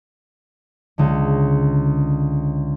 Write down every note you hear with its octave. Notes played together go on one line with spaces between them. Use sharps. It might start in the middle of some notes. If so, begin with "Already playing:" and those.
C#2 D3